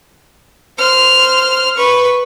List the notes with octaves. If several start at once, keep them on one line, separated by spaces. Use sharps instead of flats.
C5 F6
B4 C#6